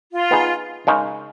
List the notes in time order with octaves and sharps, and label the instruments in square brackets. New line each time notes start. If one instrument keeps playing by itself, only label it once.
[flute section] F4
[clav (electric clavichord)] B3 D#4 G#4
C#3 G#3 D#4 A#4 C#5